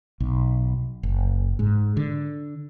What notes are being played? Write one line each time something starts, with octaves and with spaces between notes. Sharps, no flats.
B1
F#1
G#2
D3